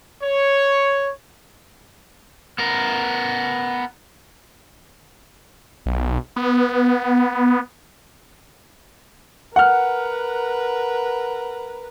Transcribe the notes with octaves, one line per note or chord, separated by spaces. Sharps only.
C#5
B3 A#4
B1
B3
A#4 B4 F#5 F6